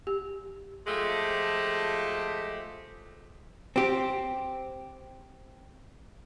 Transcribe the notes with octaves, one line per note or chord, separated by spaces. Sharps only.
G4
F3 G#3 A3 G4
C4 G4